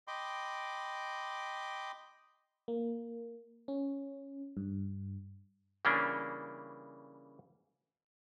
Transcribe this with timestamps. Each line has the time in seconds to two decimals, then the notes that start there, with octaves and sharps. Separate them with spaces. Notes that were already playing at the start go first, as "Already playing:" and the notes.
0.08 D#5 G5 B5 C6 D6
2.68 A#3
3.68 C#4
4.57 G2
5.85 C#3 E3 G3 A#3 C#4 D4